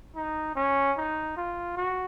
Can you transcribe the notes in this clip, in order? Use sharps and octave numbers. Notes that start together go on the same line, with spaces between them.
D#4
C#4
D#4
F4
F#4